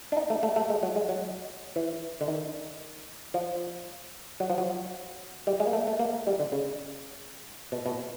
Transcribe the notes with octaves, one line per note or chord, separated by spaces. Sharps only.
D4
D#4
A3
A3
A3
G#3
F#3
G#3
F#3
E3
D3
D#3
F3
F#3
F3
F#3
G3
G#3
A#3
A3
A3
A#3
G3
D3
C#3
B2
B2